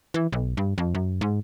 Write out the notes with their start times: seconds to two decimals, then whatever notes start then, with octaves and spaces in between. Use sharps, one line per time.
0.14 E3
0.33 B1
0.57 G2
0.78 F2
0.95 F#2
1.21 G#2